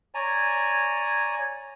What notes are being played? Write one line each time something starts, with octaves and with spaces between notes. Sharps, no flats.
C#5 D5 G#5 A#5